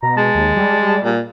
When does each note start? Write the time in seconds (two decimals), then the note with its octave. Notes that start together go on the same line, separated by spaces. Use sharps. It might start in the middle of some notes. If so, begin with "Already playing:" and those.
0.03 B2 A#5
0.17 G#3 A5
0.35 D#2
0.57 G3
1.04 A#2